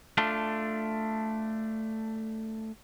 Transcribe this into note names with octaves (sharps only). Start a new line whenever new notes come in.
A3 D4 F4